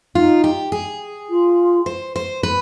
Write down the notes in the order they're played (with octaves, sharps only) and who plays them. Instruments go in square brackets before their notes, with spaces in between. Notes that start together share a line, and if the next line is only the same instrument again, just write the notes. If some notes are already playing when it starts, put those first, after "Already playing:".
[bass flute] D#4 [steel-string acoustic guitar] F4
[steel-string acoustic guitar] G4
G#4
[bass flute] F4
[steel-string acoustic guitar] C5
C5
B4